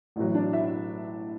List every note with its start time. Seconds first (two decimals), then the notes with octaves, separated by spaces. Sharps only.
0.16 A1 A2 F#3
0.34 D4 D5
0.53 E4 E5